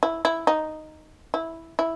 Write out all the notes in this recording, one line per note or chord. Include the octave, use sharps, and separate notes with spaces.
E4
E4
D#4
E4
E4